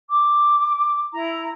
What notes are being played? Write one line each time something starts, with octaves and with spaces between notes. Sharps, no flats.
D6
E4 A#5